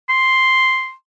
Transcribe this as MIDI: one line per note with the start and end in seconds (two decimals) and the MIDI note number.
0.09 0.93 84